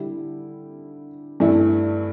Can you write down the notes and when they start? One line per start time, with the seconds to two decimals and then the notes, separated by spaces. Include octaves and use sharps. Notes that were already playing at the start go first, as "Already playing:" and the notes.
Already playing: D3 G3 E4 G4
1.40 G2 E3 A3 E4